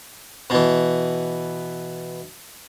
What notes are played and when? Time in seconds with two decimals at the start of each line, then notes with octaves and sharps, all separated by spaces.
0.50 B2 E3